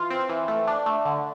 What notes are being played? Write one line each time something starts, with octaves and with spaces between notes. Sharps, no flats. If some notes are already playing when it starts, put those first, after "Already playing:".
Already playing: E3 F4 F5
C4
E3
A3
D4
A3
D3